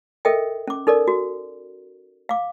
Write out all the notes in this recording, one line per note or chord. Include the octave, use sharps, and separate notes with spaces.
A4 A#4 D#5 E5 G5
C#4 D6
D#4 A4 A#4 D5
F#4
F5 D6